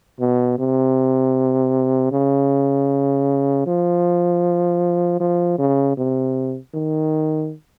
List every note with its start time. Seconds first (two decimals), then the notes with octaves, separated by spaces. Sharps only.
0.20 B2
0.58 C3
2.12 C#3
3.66 F3
5.20 F3
5.58 C#3
5.97 C3
6.74 D#3